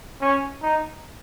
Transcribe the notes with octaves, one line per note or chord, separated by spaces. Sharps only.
C#4
D#4